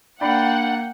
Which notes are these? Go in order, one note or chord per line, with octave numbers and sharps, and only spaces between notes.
A#3 D4 D5 F#5 G5 B5